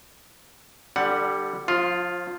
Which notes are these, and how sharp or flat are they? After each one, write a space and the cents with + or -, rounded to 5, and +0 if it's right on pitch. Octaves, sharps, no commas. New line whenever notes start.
D3 +25 G3 +0 F#5 +0
F3 +30 F4 +0